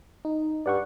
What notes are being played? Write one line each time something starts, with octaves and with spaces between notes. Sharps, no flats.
D#4
G2 D5 F#5 C#6